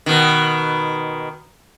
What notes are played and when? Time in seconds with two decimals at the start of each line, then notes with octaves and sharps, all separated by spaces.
0.06 B2 D#3